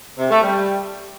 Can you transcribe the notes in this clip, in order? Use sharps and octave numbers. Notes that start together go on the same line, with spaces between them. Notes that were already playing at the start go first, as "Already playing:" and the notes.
C3
A3
G3